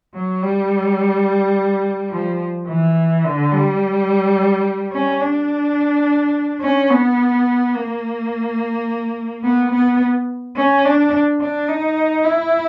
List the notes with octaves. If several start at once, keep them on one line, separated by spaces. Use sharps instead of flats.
F#3
G3
F3
E3
D3
G3
C#4
D4
C#4
B3
A#3
B3
B3
C#4
D4
D4
D#4
E4